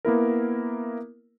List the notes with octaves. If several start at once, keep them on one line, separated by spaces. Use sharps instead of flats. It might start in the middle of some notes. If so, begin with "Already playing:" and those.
A#3 B3 E4 A#4